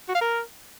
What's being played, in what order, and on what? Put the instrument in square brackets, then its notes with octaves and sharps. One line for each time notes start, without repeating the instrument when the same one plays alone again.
[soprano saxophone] F#4
F5
A#4